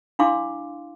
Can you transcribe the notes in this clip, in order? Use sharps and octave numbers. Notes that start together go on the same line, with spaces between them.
D4 E4 F5 C6 D6